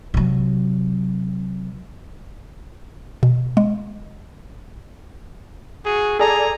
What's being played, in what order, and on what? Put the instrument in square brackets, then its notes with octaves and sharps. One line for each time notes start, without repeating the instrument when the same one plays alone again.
[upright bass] C3 F#3
[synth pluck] B2
G#3
[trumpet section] F#4 G#4
[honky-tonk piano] G#4 A4 D5 [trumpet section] G#5 A#5